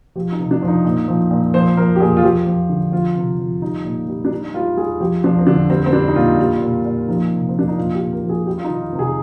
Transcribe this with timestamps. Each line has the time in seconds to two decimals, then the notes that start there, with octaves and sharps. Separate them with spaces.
0.16 F3 G4
0.32 D#4
0.39 C3
0.51 D4
0.62 F3
0.68 D#4
0.85 A#2
1.08 F3
1.31 A#2
1.54 F3 C5
1.77 F3 A#4
1.96 G4
2.00 A#2 G#4
2.17 F4
2.23 F3 G4
2.46 F3
2.69 D3
2.92 F3 F4
3.16 C3
3.39 F3
3.62 G3 D#4
3.85 A#2
4.08 G3
4.25 D4
4.31 G3 D#4
4.54 G3 F4
4.77 G3 G#4
5.00 F3 G4
5.24 F3 D4
5.39 C4
5.47 D3 D4
5.70 G3 C4
5.86 C4
5.93 G3 D4
6.08 D#4
6.16 A#2 F4
6.39 G3
6.62 A#2
6.85 A#2
7.08 F3 D#4
7.31 C3
7.49 C4
7.54 F3 D4
7.68 D#4
7.78 A#2 F4
7.95 G4
8.01 A#2
8.12 A#4
8.24 F3
8.29 G#4
8.47 G3 G4
8.58 F4
8.64 D#4
8.70 D#3
8.82 F4
8.93 C3
8.99 G#4